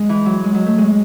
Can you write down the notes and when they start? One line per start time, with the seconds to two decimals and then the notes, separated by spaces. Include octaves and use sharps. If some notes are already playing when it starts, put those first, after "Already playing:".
Already playing: G#3
0.09 E3
0.26 F#3
0.44 G#3
0.55 F#3
0.66 A3
0.78 G#3